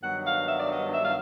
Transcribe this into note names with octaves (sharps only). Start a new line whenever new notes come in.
G2 D#3 F#3 B3 F#5
F5
E5
D5
D#5
E5
F5